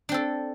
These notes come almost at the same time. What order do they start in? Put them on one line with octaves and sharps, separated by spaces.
D4 C4 A4